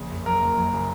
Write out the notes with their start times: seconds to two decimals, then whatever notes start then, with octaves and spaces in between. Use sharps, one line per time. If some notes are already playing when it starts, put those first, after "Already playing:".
Already playing: A#1 C#3
0.11 F#1
0.26 F#2 A#4
0.42 F#1
0.57 F#2
0.73 C#3